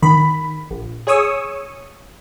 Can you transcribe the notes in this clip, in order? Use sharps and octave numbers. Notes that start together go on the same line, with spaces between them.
D#3 B5
A#1
G#4 C#5 G#5 C#6 D#6 E6